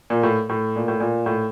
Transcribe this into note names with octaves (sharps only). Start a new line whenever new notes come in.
A#2
A2
A2
A#2
A2
A#2
A2